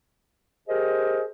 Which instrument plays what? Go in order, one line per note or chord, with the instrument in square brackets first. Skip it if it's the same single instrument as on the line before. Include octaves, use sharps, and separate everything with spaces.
[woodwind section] G4 G#4 A#4 C5 D#5